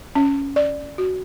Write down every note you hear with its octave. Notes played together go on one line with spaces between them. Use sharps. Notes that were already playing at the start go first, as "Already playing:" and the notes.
C#4
D5
F#4